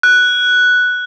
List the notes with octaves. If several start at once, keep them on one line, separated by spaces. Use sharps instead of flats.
F#6